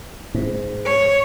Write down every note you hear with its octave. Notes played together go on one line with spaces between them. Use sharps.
G#2
C#5